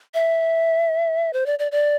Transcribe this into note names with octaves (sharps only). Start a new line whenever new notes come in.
E5
C5
D5
D5
D5